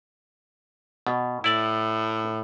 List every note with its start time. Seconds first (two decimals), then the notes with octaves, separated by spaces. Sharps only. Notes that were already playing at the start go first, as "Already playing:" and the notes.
1.07 B2
1.44 A2 E4 D5